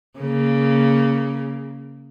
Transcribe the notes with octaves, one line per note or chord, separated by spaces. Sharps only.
C#3 A#3